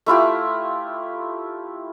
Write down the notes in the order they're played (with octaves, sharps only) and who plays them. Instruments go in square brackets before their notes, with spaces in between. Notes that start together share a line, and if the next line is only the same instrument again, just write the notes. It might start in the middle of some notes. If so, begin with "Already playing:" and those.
[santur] A3 E4 F4 G4